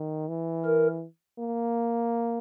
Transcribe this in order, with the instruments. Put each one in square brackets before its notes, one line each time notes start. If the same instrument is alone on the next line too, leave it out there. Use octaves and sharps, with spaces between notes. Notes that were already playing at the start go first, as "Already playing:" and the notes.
Already playing: [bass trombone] D#3
E3
[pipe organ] A#4
[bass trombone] A#3